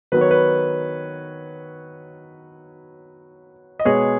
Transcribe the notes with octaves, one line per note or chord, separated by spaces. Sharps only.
D#3 F#3 B3 B4
C#5
B4
D#5
B2 G#3 B3 G#4 C#5